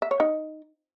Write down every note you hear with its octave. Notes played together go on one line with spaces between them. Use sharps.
E5
C#5
D#4